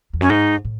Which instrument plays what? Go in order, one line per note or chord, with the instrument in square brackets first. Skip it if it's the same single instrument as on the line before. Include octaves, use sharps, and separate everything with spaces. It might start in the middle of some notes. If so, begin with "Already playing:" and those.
[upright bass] E2
[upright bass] F#2 [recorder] C#4
[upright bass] G#2 [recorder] D#4
[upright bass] A2